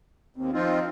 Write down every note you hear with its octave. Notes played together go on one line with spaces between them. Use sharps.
D#2 C4
F3 C4 D#4 F4